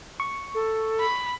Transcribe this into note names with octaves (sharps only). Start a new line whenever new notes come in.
C#6
A4
B5